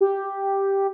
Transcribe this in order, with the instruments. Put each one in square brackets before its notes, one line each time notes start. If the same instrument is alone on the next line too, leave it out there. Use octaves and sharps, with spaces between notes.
[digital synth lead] G4